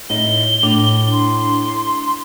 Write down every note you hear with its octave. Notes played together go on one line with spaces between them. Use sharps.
A2 D#4 G7
A2 D4
C6